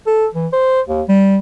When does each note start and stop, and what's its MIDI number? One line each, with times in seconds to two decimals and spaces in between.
0.07 0.27 69
0.34 0.47 52
0.53 0.81 72
0.88 1.02 39
1.08 1.39 55